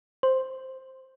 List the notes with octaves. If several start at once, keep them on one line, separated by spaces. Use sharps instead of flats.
C5